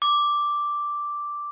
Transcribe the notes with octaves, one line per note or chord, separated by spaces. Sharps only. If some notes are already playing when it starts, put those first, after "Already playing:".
D6